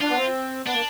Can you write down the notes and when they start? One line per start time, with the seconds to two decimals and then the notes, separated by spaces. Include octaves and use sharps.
0.01 D4 F4
0.10 B3
0.18 C4
0.66 B3 D4
0.74 A#3